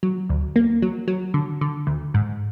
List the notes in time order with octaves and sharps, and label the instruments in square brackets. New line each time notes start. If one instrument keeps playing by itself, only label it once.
[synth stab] F#3
D2
A#3
F#3
F#3
D3
D3
D2
G#2